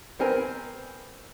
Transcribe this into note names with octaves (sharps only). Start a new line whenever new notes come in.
B3 C4 A#4 G#5